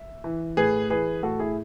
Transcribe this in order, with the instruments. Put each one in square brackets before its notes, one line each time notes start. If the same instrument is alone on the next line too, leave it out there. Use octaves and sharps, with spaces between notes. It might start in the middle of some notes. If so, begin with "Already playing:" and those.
Already playing: [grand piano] E5
E3
A2 G#4 B4
E3 G#4 B4
A2 F#4 A4
E4 G#4